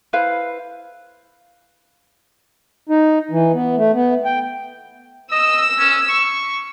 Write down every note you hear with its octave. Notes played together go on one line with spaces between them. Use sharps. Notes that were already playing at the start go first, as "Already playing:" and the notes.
E4 B4 C5 F5
D#4
E3
B3
A3
B3
G5
D#5 E6
C#4
C#6